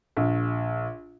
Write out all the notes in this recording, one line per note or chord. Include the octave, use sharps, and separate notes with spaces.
A#1